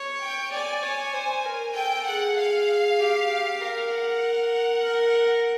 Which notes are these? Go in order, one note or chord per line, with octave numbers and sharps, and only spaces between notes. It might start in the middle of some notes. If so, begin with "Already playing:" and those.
Already playing: C#5
G5
D5 G#5
C#5
C5
A#4
A4 G5
G#4 F#5
F5
G4
A#4 F5
F#5
A#4